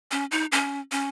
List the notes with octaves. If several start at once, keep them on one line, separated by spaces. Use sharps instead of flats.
C#4
D#4
C#4
C#4